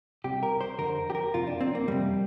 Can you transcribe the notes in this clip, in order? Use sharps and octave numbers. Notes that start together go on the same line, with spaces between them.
C2 C3 G4
A#4
C5
F2 D3 A#4
G4
A#4
F2 C3 F4
D4
C4
A#3
F2 C3 G3